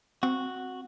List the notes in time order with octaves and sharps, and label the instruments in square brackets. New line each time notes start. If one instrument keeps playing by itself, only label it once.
[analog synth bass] C4 [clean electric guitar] F#4